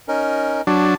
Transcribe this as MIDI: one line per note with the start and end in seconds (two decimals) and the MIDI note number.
0.08 0.61 61
0.08 0.61 63
0.08 0.61 70
0.67 0.95 54
0.67 0.95 62
0.67 0.96 81